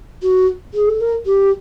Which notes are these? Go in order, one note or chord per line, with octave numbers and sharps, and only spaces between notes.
F#4
G#4
A4
A#4
G4